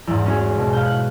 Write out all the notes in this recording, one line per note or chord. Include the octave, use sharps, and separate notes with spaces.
E2 G#2
C#4 F#4 G#4
B2
F5 G6
F#6